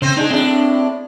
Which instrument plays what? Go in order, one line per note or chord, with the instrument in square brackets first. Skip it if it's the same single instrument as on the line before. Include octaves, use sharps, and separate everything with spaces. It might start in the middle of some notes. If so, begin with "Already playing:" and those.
[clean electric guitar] C#3 [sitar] C4 C5
[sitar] D4 G#4 [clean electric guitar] D#4
[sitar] A2 D4 [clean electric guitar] C4 G5